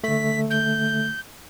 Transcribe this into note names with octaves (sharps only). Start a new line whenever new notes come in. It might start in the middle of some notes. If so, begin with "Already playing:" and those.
D3 A3 B6
G6